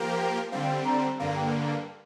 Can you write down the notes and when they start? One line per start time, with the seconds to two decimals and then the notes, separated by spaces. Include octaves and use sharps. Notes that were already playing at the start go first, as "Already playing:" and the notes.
Already playing: F3 A#3 G4 A#4
0.18 G5
0.52 D3 G3 C4 F5
0.63 G5
0.85 A#5
1.20 G2 D3 A#3 F5
1.36 G5